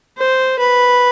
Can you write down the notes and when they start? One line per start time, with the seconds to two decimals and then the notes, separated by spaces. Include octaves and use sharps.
0.18 C5
0.59 B4